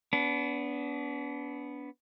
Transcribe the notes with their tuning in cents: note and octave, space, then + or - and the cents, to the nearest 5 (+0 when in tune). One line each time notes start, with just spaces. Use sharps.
B3 +0 D4 -35